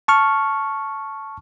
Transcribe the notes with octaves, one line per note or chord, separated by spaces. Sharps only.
A5 C#6 F6